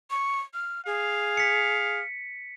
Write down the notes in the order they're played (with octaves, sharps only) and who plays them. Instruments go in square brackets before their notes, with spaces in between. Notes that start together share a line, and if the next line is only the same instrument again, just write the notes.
[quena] C#6
F6
[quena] G#4 [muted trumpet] F5
[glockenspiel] B6 C#7